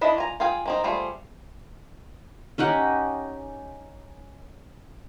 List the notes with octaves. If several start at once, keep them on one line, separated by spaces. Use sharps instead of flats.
D4 E4 D#5 F5
F4 G#5 A#5
F4 G#4 F5 G5 G#5
A#3 C4 D#4
G3 A3 F4 G#4 C5
C#4 D#4 G4 F#5